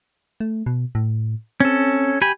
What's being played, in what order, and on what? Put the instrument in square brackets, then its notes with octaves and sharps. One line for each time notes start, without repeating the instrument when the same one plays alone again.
[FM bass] A3
B2
A2
[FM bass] C4 [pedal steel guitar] C#4 A4
[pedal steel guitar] G4 G#5 B5